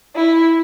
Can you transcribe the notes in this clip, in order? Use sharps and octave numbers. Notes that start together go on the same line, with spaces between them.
E4